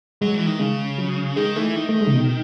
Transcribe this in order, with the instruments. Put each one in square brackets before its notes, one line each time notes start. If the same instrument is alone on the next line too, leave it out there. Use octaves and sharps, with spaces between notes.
[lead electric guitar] F#3 [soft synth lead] G#3
[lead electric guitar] E3
D#3
[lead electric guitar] C#3 [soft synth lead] G#3
[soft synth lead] F#3
[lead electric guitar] D#3 [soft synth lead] G#3
[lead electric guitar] E3 [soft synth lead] A3
[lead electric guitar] D#3
[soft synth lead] A3
G#3
C#3
B2